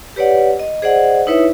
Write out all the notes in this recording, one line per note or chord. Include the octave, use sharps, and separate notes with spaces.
G4 B4 C#5 D5 F#5
D#5
G#4 C5 D5 D#5 F#5
D#4 E4 B4 C#5 E5